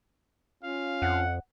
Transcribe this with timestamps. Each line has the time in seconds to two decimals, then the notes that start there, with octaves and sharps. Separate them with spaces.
0.63 C#4 F4 F5
1.02 F2 F#5